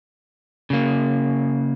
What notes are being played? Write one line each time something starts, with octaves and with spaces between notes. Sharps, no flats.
C#3 A#3